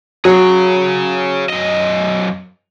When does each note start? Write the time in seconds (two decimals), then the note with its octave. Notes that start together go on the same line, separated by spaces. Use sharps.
0.25 F#3 G#4 C#5
1.50 F#2 D#5